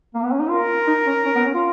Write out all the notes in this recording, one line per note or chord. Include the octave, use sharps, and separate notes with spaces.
A#3
B3
C#4
D#4
F4 A#4
D#4
C#4
C#4
B3
C#4
F4